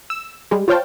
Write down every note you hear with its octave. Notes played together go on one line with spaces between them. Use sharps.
E6
G3 G#3
F4 C5 C#5 F5 G5 A5